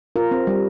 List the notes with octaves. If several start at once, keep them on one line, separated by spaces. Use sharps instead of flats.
F4 A#4
C4
G3